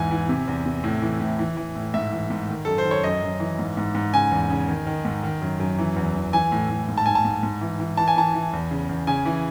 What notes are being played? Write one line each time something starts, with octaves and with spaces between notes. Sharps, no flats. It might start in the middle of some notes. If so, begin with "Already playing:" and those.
Already playing: E2 G#2 E3 G#5
E3
C3
E2
C3
A2
E3
A2
E3
E3
A2
G#2 E5
E3
G#2
D#3
F#2 A4
C5
D#3
C#5
F#2 D#5
F#2
E3
G#2
G#2
G#2
C#3 G#5
E2
C#3
D#3
D#3
G#2
D#3
F#2
F#2
E3
E2
E2
E3 G#5
A2
A2
G#2
A5
G#2 G#5
A5
G#2
G#2
E3
E3
E3 A5
G#5
E3 A5
E3
E2
C#3
E2
C#3 G#5
E3